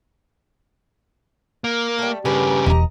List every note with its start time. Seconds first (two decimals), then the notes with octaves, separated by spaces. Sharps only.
1.64 A#3
1.99 G3 A3
2.25 G2 C#3 G4 G#4 A#4 B4
2.66 E1 D#5 A#5